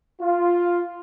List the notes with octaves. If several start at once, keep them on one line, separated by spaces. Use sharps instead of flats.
F4